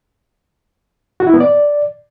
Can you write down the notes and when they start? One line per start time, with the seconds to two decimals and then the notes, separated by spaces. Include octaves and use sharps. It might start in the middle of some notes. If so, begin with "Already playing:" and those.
1.20 F#4
1.27 E4
1.34 B3
1.40 D5